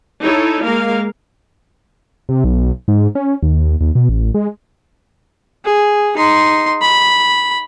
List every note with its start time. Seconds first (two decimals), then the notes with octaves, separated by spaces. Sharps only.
0.21 D#4 E4 A4 C#5
0.64 G#3 A#3 A#4 F5
2.29 C3
2.44 B1
2.88 G#2
3.15 C#4
3.42 D#2
3.81 D#2
3.95 B2
4.09 A1
4.34 G#3
5.65 G#4
6.17 D#4 C6
6.82 B5